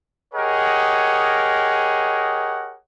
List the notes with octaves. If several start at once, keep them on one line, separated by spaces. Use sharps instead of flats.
G4 G#4 A#4 C#5 D#5 F#5